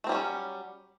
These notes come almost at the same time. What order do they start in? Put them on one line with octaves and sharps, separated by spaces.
A3 C4 G3 C#4 F#3